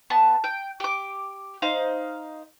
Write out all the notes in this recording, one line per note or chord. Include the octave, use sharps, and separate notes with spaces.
B3 A5
G5
G4 D6
D#4 C5 F5